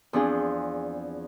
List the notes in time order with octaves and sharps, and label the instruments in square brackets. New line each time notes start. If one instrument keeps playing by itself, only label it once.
[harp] E2 F3 C4 D4 G#4